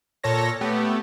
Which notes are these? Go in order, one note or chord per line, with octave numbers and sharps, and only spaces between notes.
A#2 A4 C#5 A#6
A3 B3 G4